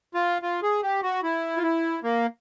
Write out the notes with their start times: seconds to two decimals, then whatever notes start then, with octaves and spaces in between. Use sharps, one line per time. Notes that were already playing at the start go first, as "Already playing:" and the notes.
0.14 F4
0.42 F4
0.63 G#4
0.83 G4
1.02 F#4
1.23 E4
1.57 F4
1.63 E4
2.04 A#3